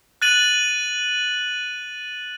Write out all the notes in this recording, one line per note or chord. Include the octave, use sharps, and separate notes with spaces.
F#6 A6 D#7 F#7